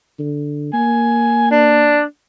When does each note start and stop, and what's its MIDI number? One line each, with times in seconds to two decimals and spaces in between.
0.19 0.73 50
0.73 2.02 58
0.73 1.50 80
1.51 2.02 62